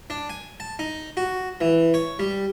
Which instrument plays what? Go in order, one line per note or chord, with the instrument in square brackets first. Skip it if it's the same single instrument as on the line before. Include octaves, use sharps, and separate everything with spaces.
[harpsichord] D4
G#5
A5
D#4
F#4
E3
C#5
G3